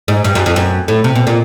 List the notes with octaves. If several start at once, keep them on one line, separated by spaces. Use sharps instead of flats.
G#2
G2
F#2
F2
F#2
A2
C3
B2
A#2